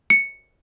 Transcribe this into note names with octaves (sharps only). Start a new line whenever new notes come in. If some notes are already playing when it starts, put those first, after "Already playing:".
C#7